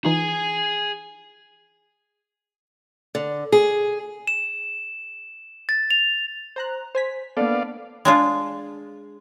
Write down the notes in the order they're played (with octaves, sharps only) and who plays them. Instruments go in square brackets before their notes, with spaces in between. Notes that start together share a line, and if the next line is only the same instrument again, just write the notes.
[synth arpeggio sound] E3 D#4 F4 [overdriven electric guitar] G#4 G#5
[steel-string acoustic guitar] D3
G#4
[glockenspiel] E7
A6
F7
[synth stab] C5 A#5 F#6
C5 G#5 B6
[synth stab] A#3 D4 A4 [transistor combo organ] B3 D5 F5
[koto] G#3 D4 F4